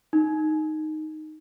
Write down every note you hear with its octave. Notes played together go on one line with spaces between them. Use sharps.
D#4